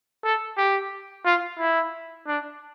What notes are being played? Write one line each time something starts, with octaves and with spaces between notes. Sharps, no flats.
A4
G4
F4
E4
D4